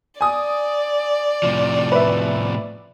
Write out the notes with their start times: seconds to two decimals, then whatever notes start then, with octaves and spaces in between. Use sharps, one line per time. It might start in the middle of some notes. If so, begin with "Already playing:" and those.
0.21 D5 G#5 D#6
1.43 A2 C3 F3
1.92 B4 E5